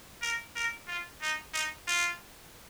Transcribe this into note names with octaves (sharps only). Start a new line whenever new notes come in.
A#4
A#4
F4
D#4
D#4
F4